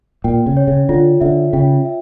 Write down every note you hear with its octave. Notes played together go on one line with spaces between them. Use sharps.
A#2 G5
C#3
C#5
C#3
D3 F4
D3 E5
C#3 G5
E5